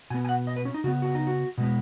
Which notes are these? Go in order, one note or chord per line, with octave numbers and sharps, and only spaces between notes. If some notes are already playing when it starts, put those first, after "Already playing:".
B2 B3 G#5
G#5
F#5
D#5
B4
C#4
D#4
C#3 B3 F#4
F#4
D#4
F#4
B2 G#3 B3